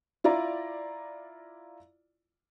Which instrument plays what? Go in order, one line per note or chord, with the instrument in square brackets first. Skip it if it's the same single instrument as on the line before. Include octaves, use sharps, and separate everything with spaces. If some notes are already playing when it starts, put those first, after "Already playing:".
[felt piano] E4 F4 D5 A#5